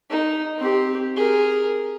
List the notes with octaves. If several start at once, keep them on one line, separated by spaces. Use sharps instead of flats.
D#4
C4 G4
G#4 A#4